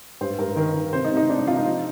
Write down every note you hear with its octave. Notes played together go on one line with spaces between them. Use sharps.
G2 C5
G2 A#4
D#3 A#4
D#3
C3 C5
D#4
C3
D#4
C3 D4
D#4
C3 F4
D#4
F3